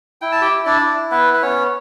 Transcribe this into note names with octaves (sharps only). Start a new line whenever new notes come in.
E4 G5
A5
G4 G5
E4
D4 D5
E4
B3 B4
B4
B3 C#4 C#5